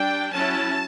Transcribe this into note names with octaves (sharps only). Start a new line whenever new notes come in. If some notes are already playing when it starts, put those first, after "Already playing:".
Already playing: G3 D4 G5
F#3 C#4 E4 A5